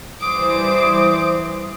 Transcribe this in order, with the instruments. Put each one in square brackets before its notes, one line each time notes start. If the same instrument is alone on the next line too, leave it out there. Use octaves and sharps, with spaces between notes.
[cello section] E3 G3 C5 [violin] D6 [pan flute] D#6